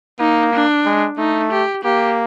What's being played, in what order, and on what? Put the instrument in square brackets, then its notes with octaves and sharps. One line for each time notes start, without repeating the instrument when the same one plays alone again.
[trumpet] A#3 [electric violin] D#4
[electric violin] D4
[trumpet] G#3
[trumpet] A3 [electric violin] D#4
[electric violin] G4
[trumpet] A#3 [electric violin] G4